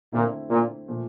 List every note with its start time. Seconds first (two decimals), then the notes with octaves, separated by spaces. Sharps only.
0.13 A#2 D3 A3 C4 E4
0.50 A#2
0.88 A#2 F3 A3